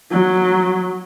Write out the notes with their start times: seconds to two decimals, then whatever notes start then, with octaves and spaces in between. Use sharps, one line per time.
0.11 F#3